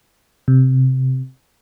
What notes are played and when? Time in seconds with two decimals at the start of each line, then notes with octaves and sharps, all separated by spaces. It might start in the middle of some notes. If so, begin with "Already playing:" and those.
0.48 C3